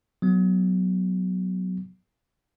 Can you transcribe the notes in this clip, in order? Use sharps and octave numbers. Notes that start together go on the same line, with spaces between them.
F#3 B3